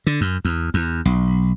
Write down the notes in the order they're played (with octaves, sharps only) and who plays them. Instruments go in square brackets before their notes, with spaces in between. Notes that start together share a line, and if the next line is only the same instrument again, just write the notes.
[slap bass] D3
F#2
E2
E2
B1